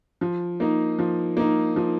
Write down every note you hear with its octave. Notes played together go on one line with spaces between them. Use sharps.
F3
A#3 D#4
F3
A#3 D#4
F3